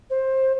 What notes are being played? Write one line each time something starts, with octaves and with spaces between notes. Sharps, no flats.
C5